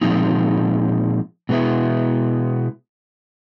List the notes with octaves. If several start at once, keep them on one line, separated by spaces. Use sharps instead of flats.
A#2 F3 G#3 C4 D#4
B2 G#3 B3 E4